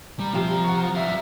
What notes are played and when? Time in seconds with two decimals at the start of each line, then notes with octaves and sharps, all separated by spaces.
0.19 G3 A#5
0.34 C3 F3 F5
0.64 C#5 F#5
0.95 G3 E5 F5